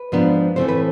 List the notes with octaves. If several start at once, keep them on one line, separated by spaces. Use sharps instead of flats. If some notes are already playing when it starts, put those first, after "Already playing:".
Already playing: B4
G#2 F3 B3 D4
A2 E3 A3 C4 C5
B4